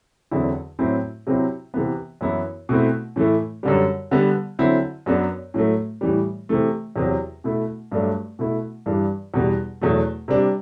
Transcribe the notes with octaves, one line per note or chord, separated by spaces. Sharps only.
E2 D3 F#3 C4 E4
A2 F#3 C4 E4
C3 F#3 C4 E4
C3 E3 B3
F#2 E3 B3 E4
B2 A3 C4 E4
A2 E3 A3 E4
F#2 D3 G3
D3 G3 B3
D3 F#3 C4 E4
F#2 F#3 B3 D4
A2 F#3 A3
A2 E3 G3
C3 E3 A3
E2 C3 F#3
B2 A3 E4
G2 F#3 A3 D4
B2 A3 E4
G2 E3 G3 D4
E2 B2 G3
E2 B2 F#3 A3
C3 G3 D4